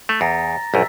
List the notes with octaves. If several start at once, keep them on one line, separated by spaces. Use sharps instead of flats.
A3
E2 A#5 A6 A#6
A#1 F#2 E6 B6